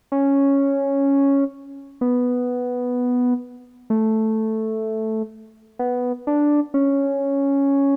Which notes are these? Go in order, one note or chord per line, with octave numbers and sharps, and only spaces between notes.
C#4
B3
A3
B3
D4
C#4